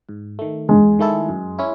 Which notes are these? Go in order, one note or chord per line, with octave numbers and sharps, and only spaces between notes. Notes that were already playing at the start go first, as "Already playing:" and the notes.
G#2
D#3 A3
E2 G#3
D#3 A3 E4 A4
F#2
C#4 E4